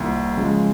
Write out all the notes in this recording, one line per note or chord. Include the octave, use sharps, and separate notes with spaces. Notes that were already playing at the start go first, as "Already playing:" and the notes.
Already playing: C2 C3 D#3 A#3 F4
C#3 F3 G#3